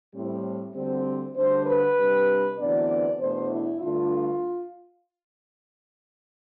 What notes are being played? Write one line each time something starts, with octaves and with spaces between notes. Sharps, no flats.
A2 G3 C4
D2 D3 G3 C4
D2 D3 G3 D4 C5
B4
C3 G3 D4
D2 C3 E3 B3 D4 D5
E2 B2 A3 D4 C5
E4
G2 D3 A3 D4 F4